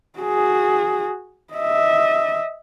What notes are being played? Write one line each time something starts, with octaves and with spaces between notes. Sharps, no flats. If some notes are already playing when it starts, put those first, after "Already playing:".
F#4 G#4
D#5 E5